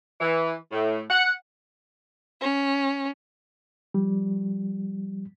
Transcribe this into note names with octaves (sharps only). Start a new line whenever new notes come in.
E3
A2
F#5
C#4
F3 G3